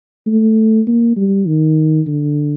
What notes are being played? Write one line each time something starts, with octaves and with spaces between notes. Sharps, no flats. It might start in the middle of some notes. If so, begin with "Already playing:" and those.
A3
A#3
G3
D#3
D3